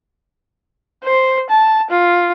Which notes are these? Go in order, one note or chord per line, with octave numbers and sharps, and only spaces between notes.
C5
A5
F4